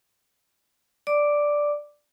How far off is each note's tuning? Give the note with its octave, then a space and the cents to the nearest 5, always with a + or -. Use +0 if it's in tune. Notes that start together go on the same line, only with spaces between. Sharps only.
D5 +0 D6 +0